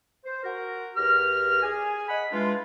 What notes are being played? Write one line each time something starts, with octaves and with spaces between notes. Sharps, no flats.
C5
F#4 A#4
E2 G4 A#4 F6
G#4 G#5
D#5 F#5 B5
E3 G#3 D4 F4